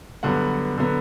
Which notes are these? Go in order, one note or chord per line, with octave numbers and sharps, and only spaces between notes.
G2 D3 F#3 B3 F#5
D3 F#3 B3